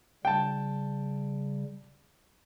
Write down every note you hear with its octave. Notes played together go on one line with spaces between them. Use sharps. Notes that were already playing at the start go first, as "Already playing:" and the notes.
C#3 G3 G5 A5